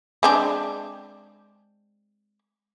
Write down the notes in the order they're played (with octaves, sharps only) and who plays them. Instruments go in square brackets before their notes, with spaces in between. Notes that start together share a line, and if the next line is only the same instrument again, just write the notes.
[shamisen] G#3 C4 D4